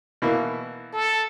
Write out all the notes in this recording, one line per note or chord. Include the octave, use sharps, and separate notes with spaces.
B2 E3 A#3
A4